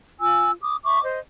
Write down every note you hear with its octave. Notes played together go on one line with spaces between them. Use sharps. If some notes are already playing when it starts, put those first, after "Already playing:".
F4 G#5 E6
D6 D#6
E5 C#6 D6
C5 D#5